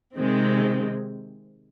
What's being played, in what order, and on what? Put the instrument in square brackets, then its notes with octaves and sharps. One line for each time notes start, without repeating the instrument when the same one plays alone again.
[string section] C3 D#3 G#3 C4